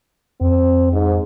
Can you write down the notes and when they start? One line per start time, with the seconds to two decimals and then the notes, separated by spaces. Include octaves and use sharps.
0.41 F2 C4
0.93 G#2